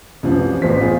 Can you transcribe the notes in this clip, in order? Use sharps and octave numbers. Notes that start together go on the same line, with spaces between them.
C2 F#2 E3 F3
A1 E2 C5 B6
F4 G#4